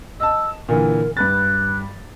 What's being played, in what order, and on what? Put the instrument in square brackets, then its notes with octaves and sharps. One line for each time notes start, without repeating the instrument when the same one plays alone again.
[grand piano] D#5 A5 [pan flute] E6
[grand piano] A#2 D3 E3 [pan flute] A#4
[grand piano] G2 B4 A6 [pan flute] F#6